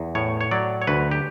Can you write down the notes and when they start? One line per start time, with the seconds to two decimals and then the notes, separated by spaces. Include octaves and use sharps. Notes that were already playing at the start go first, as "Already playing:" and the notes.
Already playing: E2
0.15 A2 C#5
0.41 C#5
0.51 F#3 D5
0.82 C#5
0.87 D2 B4
1.11 G4